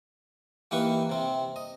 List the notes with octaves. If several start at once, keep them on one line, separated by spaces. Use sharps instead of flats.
E3 A#3 D#4 G4 B4 C#6
C3 C4
D#5